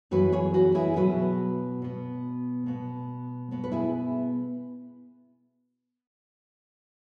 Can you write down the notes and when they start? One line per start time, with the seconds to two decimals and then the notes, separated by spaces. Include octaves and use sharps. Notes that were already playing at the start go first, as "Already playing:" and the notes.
0.11 F#2 E3 B3 F#4 B4
0.32 G#4 C#5
0.54 F#4 B4
0.75 E4 G#4
0.96 B2 F#3 B3 F#4 B4
1.82 B2 B3
2.66 B2 B3
3.51 B2 B3
3.64 B4
3.72 E4 G#4